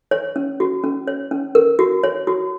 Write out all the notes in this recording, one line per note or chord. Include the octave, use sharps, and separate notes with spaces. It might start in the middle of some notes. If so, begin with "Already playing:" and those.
C#5
C#4
F#4
C#4
C#5
C#4
A#4
F#4
C#5
F#4